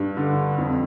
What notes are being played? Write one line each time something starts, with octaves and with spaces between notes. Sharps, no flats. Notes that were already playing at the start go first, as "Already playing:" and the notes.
Already playing: G2
D3
F2